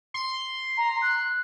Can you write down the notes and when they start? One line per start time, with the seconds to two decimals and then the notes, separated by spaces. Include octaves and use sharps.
0.14 C6
0.77 A#5
1.02 F#6